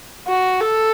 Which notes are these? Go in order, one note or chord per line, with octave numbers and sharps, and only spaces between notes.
F#4
A4